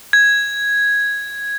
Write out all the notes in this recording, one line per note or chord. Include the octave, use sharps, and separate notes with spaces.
G#6